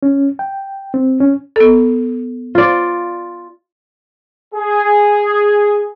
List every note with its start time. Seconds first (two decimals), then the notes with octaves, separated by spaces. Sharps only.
0.03 C#4
0.39 G5
0.94 C4
1.20 C#4
1.56 B3 A4
2.55 F4 D5
4.55 G#4